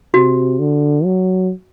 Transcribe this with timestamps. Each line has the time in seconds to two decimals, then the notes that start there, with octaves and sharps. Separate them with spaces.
0.14 C3 F#4
0.59 D3
1.05 F#3